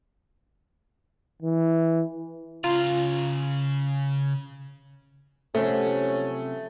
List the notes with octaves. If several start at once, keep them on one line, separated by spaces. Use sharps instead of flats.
E3
C#3 F4 A#5
C3 F3 F#3 A3 C#4 A4